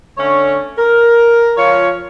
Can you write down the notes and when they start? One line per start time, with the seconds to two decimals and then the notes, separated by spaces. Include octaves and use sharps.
0.18 D3 A3 C#4 C#5
0.78 A#4
1.57 F3 F4 C#5